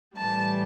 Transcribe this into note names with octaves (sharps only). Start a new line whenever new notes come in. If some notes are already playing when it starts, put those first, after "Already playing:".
A2 E3 G3 A5